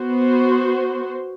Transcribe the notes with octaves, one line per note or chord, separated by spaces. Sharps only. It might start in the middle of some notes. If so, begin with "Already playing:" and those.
Already playing: B3 F#4 C5